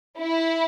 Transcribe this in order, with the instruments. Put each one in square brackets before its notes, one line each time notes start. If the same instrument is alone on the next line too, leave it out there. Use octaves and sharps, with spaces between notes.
[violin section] E4